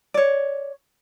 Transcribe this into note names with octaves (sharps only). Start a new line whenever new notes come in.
C#5 D5